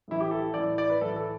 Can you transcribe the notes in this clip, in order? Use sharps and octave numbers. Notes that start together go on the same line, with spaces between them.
A2 E3 E4
G4
A4
A2 E3 D5
D5
B4
A2 E3 A4
A4